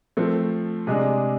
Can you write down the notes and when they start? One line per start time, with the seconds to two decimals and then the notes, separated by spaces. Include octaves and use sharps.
0.17 F3 A3 C4
0.87 C3 G#3 D4 G#4